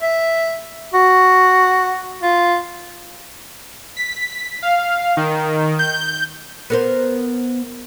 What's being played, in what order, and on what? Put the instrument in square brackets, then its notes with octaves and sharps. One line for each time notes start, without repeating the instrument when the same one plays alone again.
[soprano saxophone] E5
F#4
F4
[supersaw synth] B6
F5
D#3
G6
[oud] B3 A#4 C5